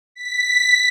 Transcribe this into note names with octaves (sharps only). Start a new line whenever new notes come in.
B6